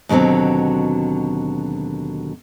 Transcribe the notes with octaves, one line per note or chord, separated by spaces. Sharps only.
D#2 B2 D3 F#3 C4